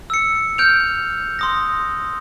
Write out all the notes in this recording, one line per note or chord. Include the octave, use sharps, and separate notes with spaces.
E6 C#7
F6 G6 D7 F7
C6 D#6 A#6